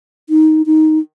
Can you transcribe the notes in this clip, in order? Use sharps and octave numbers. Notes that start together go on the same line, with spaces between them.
D#4
D#4